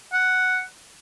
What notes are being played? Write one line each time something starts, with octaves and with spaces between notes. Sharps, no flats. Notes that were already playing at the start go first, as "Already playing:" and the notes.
F#5